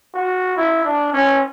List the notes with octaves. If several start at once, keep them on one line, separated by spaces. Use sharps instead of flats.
F#4
E4
D4
C#4